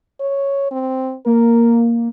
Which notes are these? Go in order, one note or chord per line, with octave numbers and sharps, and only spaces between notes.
C#5
C4
A#3 A#4